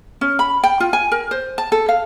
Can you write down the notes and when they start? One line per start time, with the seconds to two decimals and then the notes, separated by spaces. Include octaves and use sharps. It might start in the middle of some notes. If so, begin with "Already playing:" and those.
0.21 C#4
0.39 B5
0.64 G5
0.80 F4
0.93 G#5
1.11 A#4
1.31 C5
1.58 A5
1.72 A4
1.89 F5